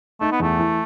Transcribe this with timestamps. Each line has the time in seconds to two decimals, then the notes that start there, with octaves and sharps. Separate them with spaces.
0.21 A3 D#4
0.32 B3
0.40 E2 A3
0.59 E3